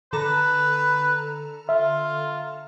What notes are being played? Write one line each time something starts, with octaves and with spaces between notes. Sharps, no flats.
D3 A4 B4 A#5
F4 E5